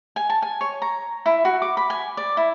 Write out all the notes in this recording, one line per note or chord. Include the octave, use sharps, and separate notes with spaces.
G#5
A5
G#5
C#5
A#5
E4
F#4
D6
B5
G#5
D5
E4